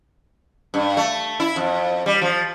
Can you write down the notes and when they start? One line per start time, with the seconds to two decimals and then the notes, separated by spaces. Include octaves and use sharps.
0.74 G2
0.97 A3
1.40 E4
1.56 F2
2.06 G3
2.22 F3